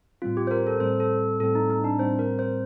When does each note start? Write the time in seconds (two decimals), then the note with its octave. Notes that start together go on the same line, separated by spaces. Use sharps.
0.22 A2 G3 C4 F4
0.37 G4
0.47 C5
0.51 A#4
0.67 A4
0.80 A2 G3 C4 C5
1.00 A4
1.40 A2 G3 C4 A4
1.55 D#4
1.70 D#4
1.84 D4
1.99 A2 G3 C4 C5
2.19 A#4
2.39 C5